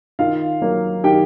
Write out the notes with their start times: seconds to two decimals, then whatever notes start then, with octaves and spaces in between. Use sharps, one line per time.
0.19 D#3 F4 F5
0.62 F#3 A#3
1.04 D#3 G4 G5